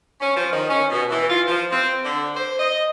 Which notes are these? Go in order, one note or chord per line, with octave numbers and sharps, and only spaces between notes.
C#4
F3
D#3
C#4
B2
E3
F4
F3
C4
D3
C5
D#5